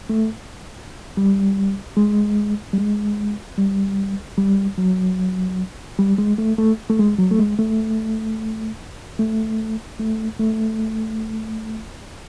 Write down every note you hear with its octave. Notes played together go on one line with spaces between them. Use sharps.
A3
G3
G#3
G3
G#3
G3
G3
F#3
G3
G#3
A3
A3
A3
G#3
F#3
A3
G#3
A3
A3
A3
A3